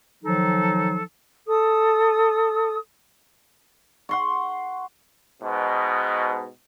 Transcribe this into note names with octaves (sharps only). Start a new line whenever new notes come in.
D#3 F3 F#3 D#4 A4
A4 D#6
F#5 C6 C#6
G#2 B2